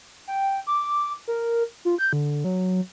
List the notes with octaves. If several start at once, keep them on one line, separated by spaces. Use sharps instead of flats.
G5
D6
A#4
F4
G6
D3
F#3